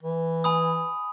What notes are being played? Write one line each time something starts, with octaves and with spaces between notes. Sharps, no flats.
E3
G#5 B5 D#6